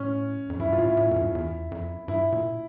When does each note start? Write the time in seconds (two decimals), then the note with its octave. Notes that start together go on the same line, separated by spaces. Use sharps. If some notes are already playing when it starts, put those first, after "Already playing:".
Already playing: A2 C#4
0.50 F2
0.60 G2 E4
0.72 G2 F4
0.78 A2
0.85 E4
0.97 A2
1.11 F2
1.16 G2
1.35 E2
1.71 F2
2.08 G2 E4
2.32 A#2